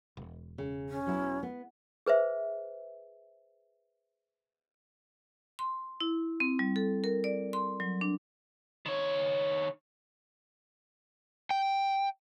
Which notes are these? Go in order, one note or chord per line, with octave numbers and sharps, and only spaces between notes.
E1
C#3
C#4
F#3 B3 E4
B3
G#4 B4 C5 E5
C6
E4
C4
G3
A4
A#4
D5
C6
F#3
D4
D#3 C#5
G5